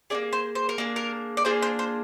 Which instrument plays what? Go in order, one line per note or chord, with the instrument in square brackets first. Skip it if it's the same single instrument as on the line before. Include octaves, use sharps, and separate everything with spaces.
[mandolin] A#3 D4 G#4 D5
C5
C5
A#4
A#3 D4 G#4
A#4
D5
A#3 D4 F4 G#4 C5
C5
C5